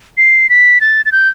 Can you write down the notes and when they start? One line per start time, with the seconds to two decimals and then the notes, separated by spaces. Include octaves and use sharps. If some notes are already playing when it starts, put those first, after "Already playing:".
0.17 C7
0.50 B6
0.81 A6
1.06 A6
1.12 G6